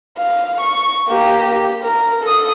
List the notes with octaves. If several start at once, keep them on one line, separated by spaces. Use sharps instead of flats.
F5
C#6
A#3 G4
G4
A#4
A4 D#6